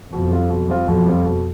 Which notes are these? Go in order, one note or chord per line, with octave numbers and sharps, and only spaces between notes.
F2 B2
G3 C4 F4
B2
G3 C4 F4
F2 B2
G3 C4 F4
B2